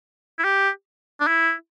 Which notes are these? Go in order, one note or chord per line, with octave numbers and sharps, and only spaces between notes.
E4
G4
D4
E4